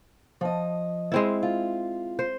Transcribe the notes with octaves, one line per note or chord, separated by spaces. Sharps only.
F3 D#5
G#3 C4 E4
F4
C5